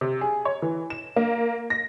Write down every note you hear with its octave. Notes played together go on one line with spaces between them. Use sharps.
C3
G#4
C#5
E3
E7
A#3
A#6